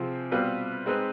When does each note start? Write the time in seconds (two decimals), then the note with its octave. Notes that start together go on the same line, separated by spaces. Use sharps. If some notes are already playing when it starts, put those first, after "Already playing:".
Already playing: C3 F3 C4 F4 G#4
0.32 B2 G3 C4 F4 B4
0.86 G#3 C4 D#4 B4